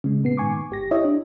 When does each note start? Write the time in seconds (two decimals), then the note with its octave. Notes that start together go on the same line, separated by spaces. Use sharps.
0.04 C#3 G#3
0.23 A#2 B3 C7
0.37 G#2 D#3 G#5 C#6 D6
0.70 G1 G4 A#6
0.91 E4 G4 C#5 D#5 E5
1.04 D4